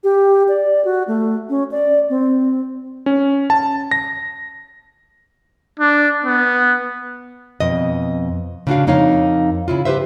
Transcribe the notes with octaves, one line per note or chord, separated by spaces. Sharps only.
G4
D5
F#4
A3
C#4
D5
C4
C#4
A5
A#6
D4
B3
F2 B2 D#5
C#3 C#4 D4 F4 F#4 F5
F2 A#3 D#4 C#5 D#5 F5
C#3 E4 F4
G4 G#4 B4 C5 E5